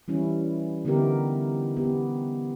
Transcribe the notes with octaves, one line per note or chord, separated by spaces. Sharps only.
E3 G3 C#4 E4
D3 B3 D#4 E4 G4 A#4
B3 G4